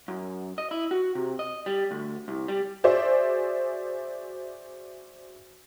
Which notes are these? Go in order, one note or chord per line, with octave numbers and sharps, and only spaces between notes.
F#2
D#5
E4
F#4
C3
D#5
G3
D2
C2
G3
F#4 G#4 C5 D5 E5